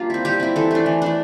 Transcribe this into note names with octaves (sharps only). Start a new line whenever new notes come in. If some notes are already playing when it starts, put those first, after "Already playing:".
Already playing: G3 A#3 D4 F4
C4 E4
G3 G4
C4 E4
E3 A4
A3 D4
E3
A3 D4